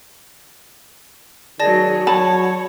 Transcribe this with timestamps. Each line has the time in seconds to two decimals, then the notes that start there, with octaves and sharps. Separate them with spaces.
1.60 D#3 F#3 D#4 G#4 D5 A5 A#6
2.07 F#3 C#5 A5 B5